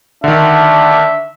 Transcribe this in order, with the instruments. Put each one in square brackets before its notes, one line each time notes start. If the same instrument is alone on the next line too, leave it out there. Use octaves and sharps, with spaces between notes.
[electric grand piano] D3 D#3 [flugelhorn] D4 [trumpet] E5